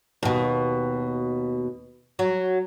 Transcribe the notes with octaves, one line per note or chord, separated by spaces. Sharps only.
D#2 B2
F#3